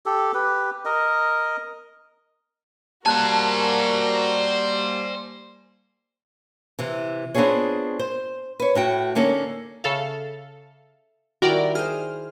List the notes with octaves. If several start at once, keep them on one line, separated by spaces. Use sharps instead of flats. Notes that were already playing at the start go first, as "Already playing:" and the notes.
G4 A4
G4 B4
A#4 D#5
G3 A#3 F#4 A#4 C5 G#5 A5 F#6
C3 E3
B3 C4 D4 F4 G#4 C#5
C5
B4 C#5
A2 F#4 G5
D3 A#3 C#4 D#4 A4
C#3 A4 E5 F5
D#3 G3 E4 F#4 A#4 D5 G5
G#4 C5 F6